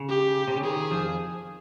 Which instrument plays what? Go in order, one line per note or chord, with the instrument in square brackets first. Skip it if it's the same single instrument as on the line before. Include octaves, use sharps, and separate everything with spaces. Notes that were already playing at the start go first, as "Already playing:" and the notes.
Already playing: [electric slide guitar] C#3
[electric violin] G4
[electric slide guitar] C3
C#3
[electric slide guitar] D#3 [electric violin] G#4
[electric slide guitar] F2 F3